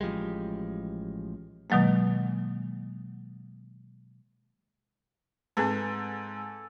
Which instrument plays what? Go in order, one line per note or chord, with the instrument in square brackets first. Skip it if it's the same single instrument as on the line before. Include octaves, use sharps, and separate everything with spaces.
[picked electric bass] A1 F3 G3 G#3
[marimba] B2 D#3 F#3 G#3 A#3
[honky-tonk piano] G#2 [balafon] C4 G#4 B4 [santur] A4 G#5